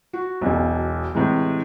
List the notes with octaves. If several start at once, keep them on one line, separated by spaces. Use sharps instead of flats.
F#4
E1 B1
A2 C3 E3 G#3